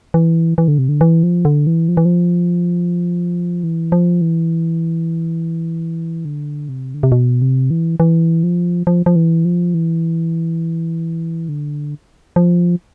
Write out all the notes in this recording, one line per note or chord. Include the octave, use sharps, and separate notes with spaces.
E3
E3
D3
C3
D3
E3
F3
D3
E3
F3
E3
F3
E3
F3
E3
D3
C3
D3
C3
B2
C3
E3
E3
F3
F3
F3
E3
F3
E3
D3
F3